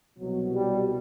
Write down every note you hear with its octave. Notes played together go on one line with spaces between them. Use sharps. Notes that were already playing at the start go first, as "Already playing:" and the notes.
C2 B2 F#3
G3